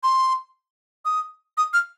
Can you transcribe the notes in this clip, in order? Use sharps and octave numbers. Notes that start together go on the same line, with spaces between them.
C6
D#6
D#6
F6